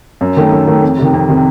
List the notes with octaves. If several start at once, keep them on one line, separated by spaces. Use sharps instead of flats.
F#2
D#3 A3
F#2
D#3 A3
F2
C3 D#3
F2
C3 D#3